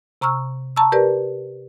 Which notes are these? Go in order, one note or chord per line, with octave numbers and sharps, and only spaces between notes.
C3 A#5 C#6 E6 F6
A5 A#5 C#6 E6
G4 A#4 B4 D5